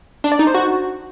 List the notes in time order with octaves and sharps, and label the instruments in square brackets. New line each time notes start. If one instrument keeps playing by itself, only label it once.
[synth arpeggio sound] D4
D5
D#4
C5
F#4